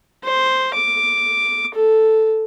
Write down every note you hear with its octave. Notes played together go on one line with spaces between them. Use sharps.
C5
D6
A4